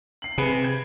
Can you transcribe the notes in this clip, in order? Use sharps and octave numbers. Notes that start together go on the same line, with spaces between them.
C7 F#7
C3 G#4 B4 B5
G#6